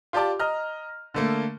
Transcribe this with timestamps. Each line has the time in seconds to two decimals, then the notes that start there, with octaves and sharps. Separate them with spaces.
0.13 F4 G4 D5 A5 D6
0.39 D#5 A#5 F6
1.14 D3 A3 A#3